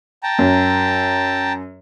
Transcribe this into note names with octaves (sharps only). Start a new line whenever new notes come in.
G5 A5 A#5
F#2